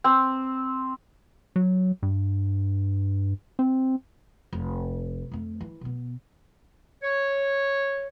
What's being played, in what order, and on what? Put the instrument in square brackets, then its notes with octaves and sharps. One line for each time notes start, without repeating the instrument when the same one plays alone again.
[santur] C4
[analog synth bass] F#3
G2
C4
[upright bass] F1
F2 A3
E3
B2 B3
[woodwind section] C#5